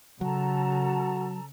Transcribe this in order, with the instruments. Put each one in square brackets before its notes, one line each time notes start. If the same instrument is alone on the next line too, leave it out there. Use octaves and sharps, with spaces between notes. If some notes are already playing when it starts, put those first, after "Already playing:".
[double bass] C#3 [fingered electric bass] F#3 [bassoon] F#4 [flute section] A4 A5 A#5